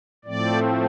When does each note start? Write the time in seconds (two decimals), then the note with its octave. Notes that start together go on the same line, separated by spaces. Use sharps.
0.25 A2 F3 A3 C4 D5